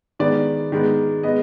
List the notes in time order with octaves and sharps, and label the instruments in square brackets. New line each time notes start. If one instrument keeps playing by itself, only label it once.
[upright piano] D#3 G#3 B3 D5
D#3 G#3 B3
G#3 B3 D#5